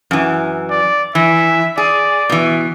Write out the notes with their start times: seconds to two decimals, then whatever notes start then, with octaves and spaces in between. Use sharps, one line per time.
0.11 F#2 E3
0.70 D5
1.15 E3 E5
1.78 G#4 D5
2.30 B2 E3